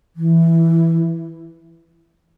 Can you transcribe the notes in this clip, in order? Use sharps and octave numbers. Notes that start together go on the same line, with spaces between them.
E3